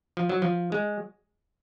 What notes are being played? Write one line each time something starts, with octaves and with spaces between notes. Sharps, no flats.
F3
F#3
F3
G#3